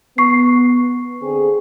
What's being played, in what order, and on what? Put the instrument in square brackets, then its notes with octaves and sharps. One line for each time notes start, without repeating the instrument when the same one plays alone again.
[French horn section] B3 [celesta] C#6 C7
[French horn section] D3 C4 G#4